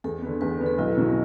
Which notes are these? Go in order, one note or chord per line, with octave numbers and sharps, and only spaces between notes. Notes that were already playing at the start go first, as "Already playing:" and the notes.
E2 A4
D3 B3
E2 B4
D3 B3
A4
B1 E4
B2 F#3